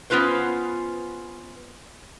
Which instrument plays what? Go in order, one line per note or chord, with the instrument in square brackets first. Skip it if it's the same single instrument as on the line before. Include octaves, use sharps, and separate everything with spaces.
[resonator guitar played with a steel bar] B3 C#4 F4 B4 C5